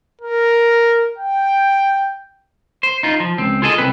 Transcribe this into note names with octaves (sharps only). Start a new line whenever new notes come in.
A#4
G5
C5
D#4 F4
F3
C#2 C4
F4 G#4 A4 D#5
C2 C4 B4